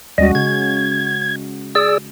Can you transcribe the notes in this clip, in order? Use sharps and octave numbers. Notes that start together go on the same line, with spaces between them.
D#2 G3 G#3 C#4 F#4 D#5
C#3 G#6
G#4 D5 E6